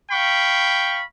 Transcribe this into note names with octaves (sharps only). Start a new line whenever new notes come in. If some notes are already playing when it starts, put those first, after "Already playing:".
F5 G5 B5 C#6